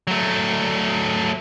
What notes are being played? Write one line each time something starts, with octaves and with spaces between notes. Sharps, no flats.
F#3 A3